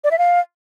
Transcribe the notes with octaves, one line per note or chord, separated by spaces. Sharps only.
D5
E5
F5